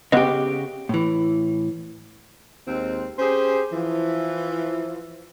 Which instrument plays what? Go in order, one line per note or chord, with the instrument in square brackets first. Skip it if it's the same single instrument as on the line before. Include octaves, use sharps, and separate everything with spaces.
[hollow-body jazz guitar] C#3 G4 [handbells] B3 B4 D#5
[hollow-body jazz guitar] A2 E3
[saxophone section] D#2 G#3 C4
C#4 G4 G#4 C5
E3 F3